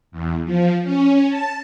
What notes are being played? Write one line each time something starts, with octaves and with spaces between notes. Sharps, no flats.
E2
F3
C#4
A5